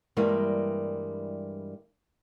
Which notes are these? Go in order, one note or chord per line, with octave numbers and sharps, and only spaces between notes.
G2 E3 G3 G#3 A#3